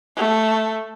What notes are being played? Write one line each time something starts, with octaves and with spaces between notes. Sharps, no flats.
A3